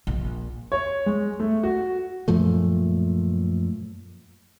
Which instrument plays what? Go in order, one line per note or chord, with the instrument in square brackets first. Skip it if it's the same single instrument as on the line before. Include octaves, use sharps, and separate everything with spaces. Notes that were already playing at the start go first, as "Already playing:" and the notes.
[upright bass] A#1
[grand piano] C#5
G#3
A3
F#4
[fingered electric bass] F#2 A#2 F3 A3